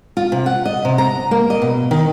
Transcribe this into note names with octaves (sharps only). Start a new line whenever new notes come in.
F4
C3
F#5
D#5
C3
A#5
A#3
D#5
B2
D#3